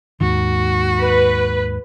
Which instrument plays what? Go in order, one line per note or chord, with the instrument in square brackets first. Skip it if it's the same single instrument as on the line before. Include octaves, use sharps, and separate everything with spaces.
[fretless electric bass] D#2 G#2 D#3 [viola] F#4
[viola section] B4